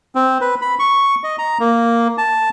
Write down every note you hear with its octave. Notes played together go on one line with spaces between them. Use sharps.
C4
B4
B5
C#6
D#5
A#5
A#3
A5